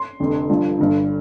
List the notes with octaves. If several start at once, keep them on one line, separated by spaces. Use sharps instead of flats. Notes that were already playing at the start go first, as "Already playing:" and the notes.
Already playing: C6
F1 F2 D3
G1 G2 F3
G1 G2 D3